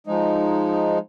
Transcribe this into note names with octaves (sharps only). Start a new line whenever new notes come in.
F3 G#3 D#4